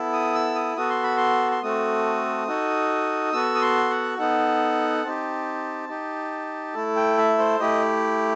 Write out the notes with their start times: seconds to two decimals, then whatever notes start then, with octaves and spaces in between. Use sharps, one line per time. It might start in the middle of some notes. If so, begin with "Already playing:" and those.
Already playing: B3 E4 A4
0.13 D#6
0.35 E6
0.55 D#6
0.77 B3 F#4 A4 D#6
0.90 C6
1.03 B5
1.17 C6
1.52 C6
1.62 A3 C4 F#4 A4 D#6
2.48 D#4 F#4 A4
3.33 B3 F#4 A4 E6
3.55 D#6
3.62 C6
3.91 F#5
4.18 B3 D#4 A4 F#5
5.04 C4 D#4 G4 A5
5.89 D#4 G4
6.74 A3 E4 A4
6.96 G5
7.17 E5
7.39 C5
7.60 A3 E4 G4 D#5